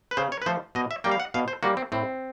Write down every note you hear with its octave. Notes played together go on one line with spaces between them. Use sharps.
B4
C#3 C5
C#5
B4
F3 A3 C5
B2 D#5
E5
G3 A#3 G5
F5
F#5
B2 F5
C5
G3 A#3 F#4
C4
A2 C4